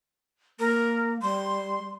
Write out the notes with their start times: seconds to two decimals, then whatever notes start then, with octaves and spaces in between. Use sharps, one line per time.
0.59 A#3 A#4
1.22 G3 C6